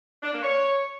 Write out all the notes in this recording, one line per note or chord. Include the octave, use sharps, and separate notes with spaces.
D4
A#3
C#5